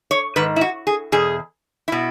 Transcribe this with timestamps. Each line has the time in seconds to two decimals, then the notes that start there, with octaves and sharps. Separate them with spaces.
0.11 C#5
0.36 G#2 D#3 B4
0.56 E4
0.61 F#4
0.87 G#4
1.12 E2 B2 G#4
1.88 B2 E4